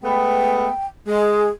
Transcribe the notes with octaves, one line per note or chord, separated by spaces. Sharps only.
G#3 A3 B3 G5
G#3 G#4